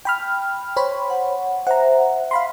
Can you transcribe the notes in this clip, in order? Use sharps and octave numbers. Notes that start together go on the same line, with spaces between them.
G5 B5 F6
C5 C#5 B5
F#5
C5 E5 F#5 A#5
F5 B5 C6